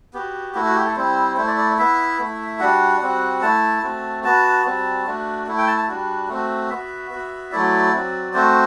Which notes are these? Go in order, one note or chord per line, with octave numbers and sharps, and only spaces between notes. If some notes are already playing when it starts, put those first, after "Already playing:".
B3 F#4 G4
A3 E4 F#4
F#4
G4
A4
G3 C4 E4 C5
A3 E4 C5
D5
D5
B3 E4 E5
A3 E4
G3 D4 F#4 F#5
G3 C4 F#4
A3 E4 A5
A3 C4 F#4
B3 F#4 A5
G3 C4 F#4
A3 D4 F#4
A3 E4
G5
A5
A5
G3 D4 F#4
A3 C4 F#4
B3 F#4 E5
B3 F#4
F#3 A3 E4 D5
F#3 C4 F#4
A3 C4 F#4 C5